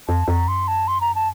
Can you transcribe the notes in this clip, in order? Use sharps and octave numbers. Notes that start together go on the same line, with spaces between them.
F2 A5
F2 A#5
F#2 C6
A5
C6
A#5
A5